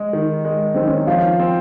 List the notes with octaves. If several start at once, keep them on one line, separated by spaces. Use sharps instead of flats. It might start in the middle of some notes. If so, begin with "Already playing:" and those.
Already playing: G#3
D#3
G#3
D#3 C4
C#4
D#4
F3 F4
C4